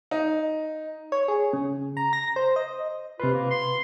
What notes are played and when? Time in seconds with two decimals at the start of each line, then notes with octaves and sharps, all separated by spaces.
0.11 D#4
1.12 C#5
1.28 G#4
1.53 C#3
1.97 A#5
2.13 A#6
2.36 C5
2.56 D#5
3.20 C3 F4 B4
3.33 A#3
3.51 C6